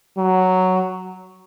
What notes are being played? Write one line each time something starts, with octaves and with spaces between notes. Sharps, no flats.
F#3